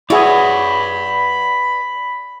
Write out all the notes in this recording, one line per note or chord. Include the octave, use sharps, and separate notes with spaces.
E4 F#4 G#4 B4 C#5 D5 B5